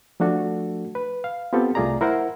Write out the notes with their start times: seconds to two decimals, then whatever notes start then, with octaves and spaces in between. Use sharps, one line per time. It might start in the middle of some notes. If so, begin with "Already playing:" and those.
0.20 F3 A3 D4 F#4 A4
0.95 B4
1.24 F5
1.53 B3 C4 F4 G4 A4
1.75 C2 A3 F4 G#4 D5 A#5
2.01 E4 A#4 C5 F#5